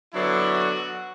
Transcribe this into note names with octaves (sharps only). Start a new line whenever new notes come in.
D3 F#3 B3 D4 E4
F#4